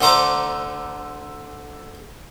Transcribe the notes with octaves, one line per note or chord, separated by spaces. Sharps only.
D2 D3 A3 C5 A#5 D6